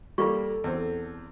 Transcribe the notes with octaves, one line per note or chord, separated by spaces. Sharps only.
G3 A#3 F4 A4 D5 C#6
E2 C4